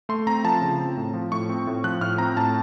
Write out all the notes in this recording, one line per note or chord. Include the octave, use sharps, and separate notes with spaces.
A3 C6
C4 A#5
F3 A5
C#3
C4
A2
F3
A2 C#6
C4
A2
F3 F#6
A2 F6
C4 A#5
A2 A5